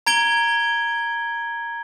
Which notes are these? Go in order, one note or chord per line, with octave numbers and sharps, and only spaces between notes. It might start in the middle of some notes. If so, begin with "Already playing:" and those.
A#5 G#6 D7 G7